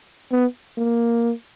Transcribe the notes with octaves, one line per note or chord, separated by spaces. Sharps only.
B3
A#3